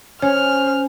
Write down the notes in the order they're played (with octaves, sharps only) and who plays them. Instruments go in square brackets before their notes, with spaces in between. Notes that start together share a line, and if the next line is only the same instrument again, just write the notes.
[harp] C#4 [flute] C5 [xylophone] C#5 [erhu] F6